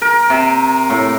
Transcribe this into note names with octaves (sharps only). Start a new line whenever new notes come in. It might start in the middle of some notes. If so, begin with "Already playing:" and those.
A#4
C3
A2